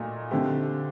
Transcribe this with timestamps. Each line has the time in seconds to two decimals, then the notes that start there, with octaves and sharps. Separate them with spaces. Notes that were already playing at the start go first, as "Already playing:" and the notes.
Already playing: A#2 A3 D#4 F#4
0.31 D3 A3 C4 G4